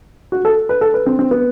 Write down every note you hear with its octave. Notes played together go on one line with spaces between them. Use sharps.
F#4
A4
B4
A4
B4
C4
C4
B3